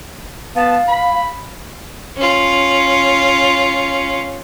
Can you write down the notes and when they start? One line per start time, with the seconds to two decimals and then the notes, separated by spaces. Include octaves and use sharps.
0.55 B3 F5 A5
0.88 B5
2.16 C#4 F4